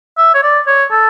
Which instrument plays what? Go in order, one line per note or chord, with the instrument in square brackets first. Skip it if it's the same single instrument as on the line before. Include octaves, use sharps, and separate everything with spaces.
[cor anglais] E5
C#5
D5
C#5
A4